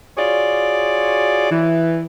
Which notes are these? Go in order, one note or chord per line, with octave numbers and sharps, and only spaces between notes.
F4 F#4 G#4 C#5 D5
E3